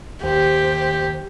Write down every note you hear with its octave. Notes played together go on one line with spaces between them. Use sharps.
D#2 G4 C5